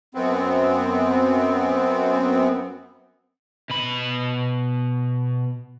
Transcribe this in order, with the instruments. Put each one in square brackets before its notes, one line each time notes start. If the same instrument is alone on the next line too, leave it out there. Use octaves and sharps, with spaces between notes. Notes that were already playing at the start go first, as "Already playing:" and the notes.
[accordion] F#2 B3 C4
[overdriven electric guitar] B2 B5